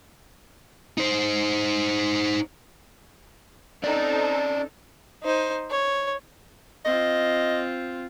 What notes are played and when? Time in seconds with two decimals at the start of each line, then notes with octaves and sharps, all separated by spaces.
0.98 D#4 C5
3.84 C4 C#4 D#4 A4 D5
5.23 D#4 C5
5.70 C#5
6.85 C4 F4 D#5